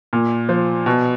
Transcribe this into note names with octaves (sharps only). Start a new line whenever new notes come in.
A#2
F3
B2